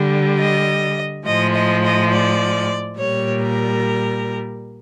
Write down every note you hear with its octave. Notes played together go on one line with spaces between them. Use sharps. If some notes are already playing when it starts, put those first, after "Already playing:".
Already playing: D3 G3
D#5
A2 F3 G#3 D#5
D#5
D#5
D5
A#2 G3 C#5
A#4